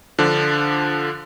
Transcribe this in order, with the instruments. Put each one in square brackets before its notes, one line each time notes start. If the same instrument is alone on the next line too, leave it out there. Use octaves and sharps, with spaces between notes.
[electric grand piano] D3 F3 D4